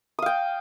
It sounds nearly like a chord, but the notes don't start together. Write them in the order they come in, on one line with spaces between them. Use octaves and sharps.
D#6 F5 G5